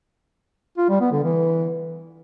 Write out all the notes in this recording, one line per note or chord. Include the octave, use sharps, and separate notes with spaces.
F4
G3
B3
D3
E3